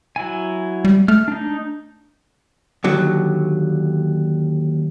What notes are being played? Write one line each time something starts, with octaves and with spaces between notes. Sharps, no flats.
F#3 E4 G#5
G3
A3 F6
D4 D#4
D#2 D3 F#3